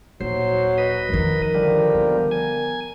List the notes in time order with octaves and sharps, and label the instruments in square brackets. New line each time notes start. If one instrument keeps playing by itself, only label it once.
[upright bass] D#1 [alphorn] F#3 [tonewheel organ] C5
[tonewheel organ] B4 D#5
[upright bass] F2 D#3 [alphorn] A#4
[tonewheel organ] D3 F3 G3
[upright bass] B3
[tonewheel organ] G#5